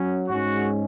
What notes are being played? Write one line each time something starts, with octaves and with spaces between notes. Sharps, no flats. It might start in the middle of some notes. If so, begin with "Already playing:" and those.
Already playing: F#3 C#4
G#2 G#3 C#4 F#4